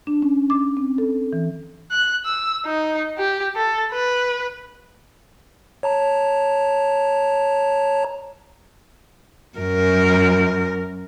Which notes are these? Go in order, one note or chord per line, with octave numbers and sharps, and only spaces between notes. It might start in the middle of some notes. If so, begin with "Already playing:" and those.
D4
C#4
D6
C4
A4
E3
F#6
E6
D#4
G4
A4
B4
C#5 A5 A#5
F#2 A#4